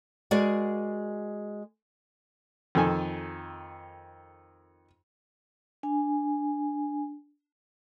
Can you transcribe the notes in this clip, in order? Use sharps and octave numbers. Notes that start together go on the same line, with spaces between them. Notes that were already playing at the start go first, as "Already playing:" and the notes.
G#3 F#4 G#4 A#4 D5
F2 D#3 A4 G#5
D4 G#5